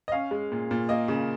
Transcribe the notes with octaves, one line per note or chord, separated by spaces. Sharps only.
D#5
C#4 F5
G#3
A#2
A#2
A#3 D#5
C#3